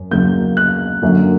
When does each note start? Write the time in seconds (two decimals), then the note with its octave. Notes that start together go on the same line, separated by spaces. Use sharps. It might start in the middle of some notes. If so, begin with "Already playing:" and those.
Already playing: F#2
0.11 F#2 C#3 F#3 A#3 G6
0.57 F#6
1.02 F#2 D3 F#3 A#3